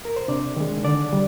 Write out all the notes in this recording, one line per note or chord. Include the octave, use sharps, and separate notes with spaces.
A#4
C5
C3 D4 D5
D#3 G#3
D3 D4 D5
G3